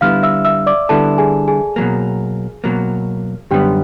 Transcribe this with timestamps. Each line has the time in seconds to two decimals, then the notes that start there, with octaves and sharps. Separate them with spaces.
0.01 D3 G3 B3 E4 F5 F6
0.23 E5 E6
0.45 E5 E6
0.66 D5 D6
0.89 D3 G3 B3 E4 A4 A5
1.18 G#4 G#5
1.48 G#4 G#5
1.76 B2 F#3 A#3
2.64 B2 F#3 A#3
3.51 F#2 D3 G3 B3 G4 G5